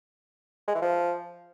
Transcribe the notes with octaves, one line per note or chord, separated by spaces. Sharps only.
G#3
E3
F3